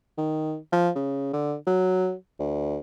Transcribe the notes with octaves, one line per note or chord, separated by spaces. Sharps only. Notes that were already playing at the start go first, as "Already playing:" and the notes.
D#3
F3
C#3
D3
F#3
D2